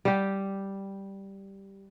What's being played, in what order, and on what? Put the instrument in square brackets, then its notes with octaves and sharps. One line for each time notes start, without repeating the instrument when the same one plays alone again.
[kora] G3 G4